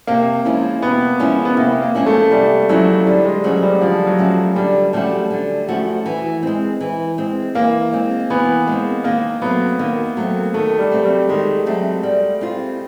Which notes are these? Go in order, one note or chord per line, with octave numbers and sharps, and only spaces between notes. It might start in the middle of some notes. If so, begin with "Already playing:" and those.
C3 A#3
F3 G#3 C#4 E4
C3 B3
F3 G#3 C#4 E4
B3
C3 A#3
A#3
F3 G#3 C#4 E4
A3
C3 G3
F3 F#3 G#3 C#4 E4
D3 G3
G#3
F3 F#3 A3 C#4 F#4
G3
D3 F3
F#3
F3 A3 C#4 F#4
D3 G3
F3 G3 A3 C#4 F#4
D3
F3 A3 C#4 F#4
E3
G#3 C4
E3
G#3 C4
E3 A#3
G#3 C4
E3 B3
G#3 C4
D#3 A#3
F#3 A3 B3 C4
D#3 A#3
F#3 A3 C4
D#3 A3
G3
F#3 A3 C4
G3
D#3 G#3
F#3 A3 C4
G3
C4 F4